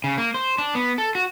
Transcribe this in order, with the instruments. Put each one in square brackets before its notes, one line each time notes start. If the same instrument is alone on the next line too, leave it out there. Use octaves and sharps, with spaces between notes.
[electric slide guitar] C#3
A#3
C5
D4
B3
A4
F#4